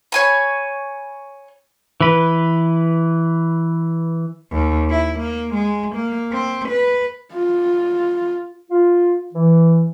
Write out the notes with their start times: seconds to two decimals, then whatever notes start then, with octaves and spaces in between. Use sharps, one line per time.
0.12 C#5 G#5 B5
2.01 E3 B4
4.52 D#2
4.90 E4
5.20 A#3
5.54 G#3
5.96 A#3
6.32 C4
6.69 B4
7.34 F4
8.70 F4
9.34 E3